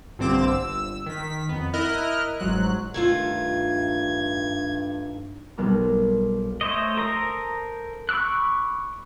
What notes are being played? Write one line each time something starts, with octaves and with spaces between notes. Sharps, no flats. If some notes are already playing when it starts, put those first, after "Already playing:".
A#1 G2 D3 C4 D6 E7
G1 E6
D#3 B6
F2 B3
E4 A#4 D#5 F6 F#6
G1 G#2 F#3 F#6
G2 D#3 A3 F4 G#6
B1 G3 B3 A#4 D6
A3 C5 C#5 D#5
A4 A#4 C5 A#5 D#6
B5 C#6 D6 E6 F#6